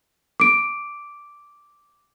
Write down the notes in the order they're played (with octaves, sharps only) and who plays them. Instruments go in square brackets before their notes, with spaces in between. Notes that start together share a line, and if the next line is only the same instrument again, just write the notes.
[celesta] D6 D7